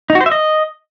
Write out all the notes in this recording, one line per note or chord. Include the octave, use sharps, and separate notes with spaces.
D#4
F#4
C5
E5
D#5